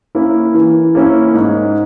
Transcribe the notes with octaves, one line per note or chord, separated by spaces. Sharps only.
A#3 C#4 E4
E3
A#3 C#4 E4
G#2